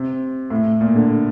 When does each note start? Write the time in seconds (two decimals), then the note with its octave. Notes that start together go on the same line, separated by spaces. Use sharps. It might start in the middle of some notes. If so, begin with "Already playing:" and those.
Already playing: C3
0.50 A2
0.81 A#2
0.95 D3